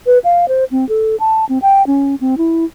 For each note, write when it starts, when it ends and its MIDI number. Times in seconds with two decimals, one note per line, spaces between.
0.06 0.18 71
0.24 0.48 77
0.48 0.64 72
0.71 0.87 60
0.89 1.16 69
1.20 1.45 81
1.49 1.59 60
1.62 1.85 79
1.87 2.15 61
2.21 2.35 60
2.38 2.65 64